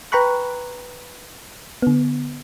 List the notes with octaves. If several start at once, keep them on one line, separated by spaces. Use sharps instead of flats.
B4 G5 A#5 B5 C#6 F#6
D3 B3